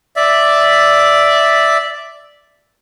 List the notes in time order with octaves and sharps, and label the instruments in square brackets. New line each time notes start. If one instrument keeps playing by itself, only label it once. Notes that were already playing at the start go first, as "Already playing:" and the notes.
[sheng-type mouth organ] D5 E5